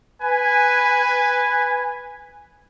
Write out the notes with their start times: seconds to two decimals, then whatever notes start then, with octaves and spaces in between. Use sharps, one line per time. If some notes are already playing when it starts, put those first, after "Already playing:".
0.22 B4 G#5